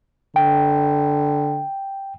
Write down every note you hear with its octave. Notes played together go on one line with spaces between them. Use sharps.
D3 G5